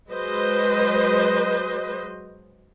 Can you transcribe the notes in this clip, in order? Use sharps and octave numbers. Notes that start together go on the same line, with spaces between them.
F#3 G#3 B4 C5 D#5